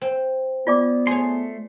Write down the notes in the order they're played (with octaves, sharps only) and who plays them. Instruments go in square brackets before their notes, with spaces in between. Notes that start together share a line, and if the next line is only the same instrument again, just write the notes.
[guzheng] C4
[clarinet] B3 [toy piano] F4 D5 D6
[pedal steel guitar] A3 C6 [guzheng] G#4 C#5